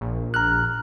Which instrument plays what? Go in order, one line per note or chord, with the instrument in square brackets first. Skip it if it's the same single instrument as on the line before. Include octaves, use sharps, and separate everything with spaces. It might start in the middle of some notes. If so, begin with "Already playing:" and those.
[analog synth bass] A#1
[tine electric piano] A#5 F6 F#6